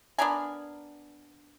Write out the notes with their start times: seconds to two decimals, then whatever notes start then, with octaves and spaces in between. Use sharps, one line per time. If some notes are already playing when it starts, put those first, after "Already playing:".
0.18 B3 D4 A#4 G#5